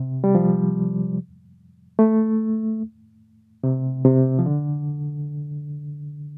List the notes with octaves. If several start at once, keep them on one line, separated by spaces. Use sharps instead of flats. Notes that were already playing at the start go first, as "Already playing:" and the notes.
Already playing: C3
G3
F3
A3
C3
C3
F3
D3